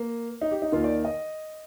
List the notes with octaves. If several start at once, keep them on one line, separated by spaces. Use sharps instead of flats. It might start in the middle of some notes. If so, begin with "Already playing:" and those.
Already playing: A#3
D#4
G4
D#4
D#2 D#3 F4
D5
D#5